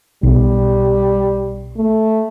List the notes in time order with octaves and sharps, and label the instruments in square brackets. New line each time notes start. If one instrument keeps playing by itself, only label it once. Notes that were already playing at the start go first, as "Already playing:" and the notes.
[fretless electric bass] B1 [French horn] G3
[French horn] A3